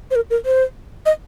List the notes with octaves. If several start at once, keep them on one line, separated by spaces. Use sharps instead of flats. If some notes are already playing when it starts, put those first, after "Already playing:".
C5
A#4
A#4
C5
D#5